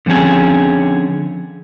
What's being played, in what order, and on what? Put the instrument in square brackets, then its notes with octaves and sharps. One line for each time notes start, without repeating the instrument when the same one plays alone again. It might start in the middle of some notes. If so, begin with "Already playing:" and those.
[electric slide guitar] D3 F3 C4 C#4 G#4